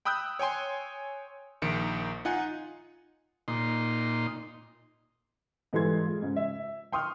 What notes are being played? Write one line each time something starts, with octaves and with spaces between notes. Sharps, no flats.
G5 B5 D#6 E6 F#6 G6
C#5 G5 G#5 C6
A#1 D#3 C#7 D7
D#4 F4 F#5 G#5
A#2 D#4 C6
G#2 E3 G3 A4 C6 G#6
G#3 F4
G#2 C#3
E5
G5 C6 C#6 D#6 F6